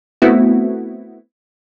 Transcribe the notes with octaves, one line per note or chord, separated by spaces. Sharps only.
A3 B3 C4 E4 F#4